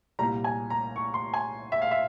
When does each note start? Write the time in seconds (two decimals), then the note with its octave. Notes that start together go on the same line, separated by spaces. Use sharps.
0.19 C2 A#2 G3 A#5
0.44 G#5
0.70 A#5
0.96 C#6
1.14 C6
1.34 G#5
1.72 E5
1.82 F5
1.91 E5